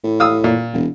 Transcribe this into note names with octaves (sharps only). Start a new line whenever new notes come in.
A2
F5 D#6 E6
A#2
E1